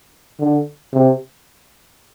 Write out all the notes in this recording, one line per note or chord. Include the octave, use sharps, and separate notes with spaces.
D3
C3